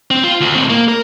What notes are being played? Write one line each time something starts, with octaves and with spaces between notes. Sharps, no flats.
C4
F4
D2
A2 C4
A#3
A#4